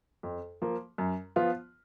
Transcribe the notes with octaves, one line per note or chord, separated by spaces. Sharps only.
F2
F3 A#3
F#2
F3 B3 F4